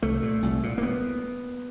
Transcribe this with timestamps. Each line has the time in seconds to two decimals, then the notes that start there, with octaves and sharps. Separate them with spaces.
0.02 C2 A3
0.22 A#2
0.42 C2
0.63 A#2
0.78 A#3
0.83 B3